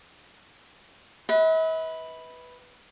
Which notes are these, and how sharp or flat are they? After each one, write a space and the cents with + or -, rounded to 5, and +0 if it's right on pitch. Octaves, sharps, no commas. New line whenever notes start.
B4 +0 E5 -45